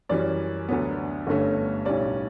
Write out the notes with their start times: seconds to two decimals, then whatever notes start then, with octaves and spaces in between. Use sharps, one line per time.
0.09 F#2 E3 G3 C#4 D5
0.69 D2 D3 F#3 B3
1.27 G1 G2 D3 A3 C#4
1.85 B1 A2 G3 C#4 D5